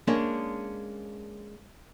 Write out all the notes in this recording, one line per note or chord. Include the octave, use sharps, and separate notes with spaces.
G#3 A#3 C#4 D4